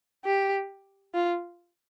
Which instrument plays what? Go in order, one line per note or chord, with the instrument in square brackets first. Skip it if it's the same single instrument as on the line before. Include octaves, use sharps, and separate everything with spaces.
[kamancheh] G4
F4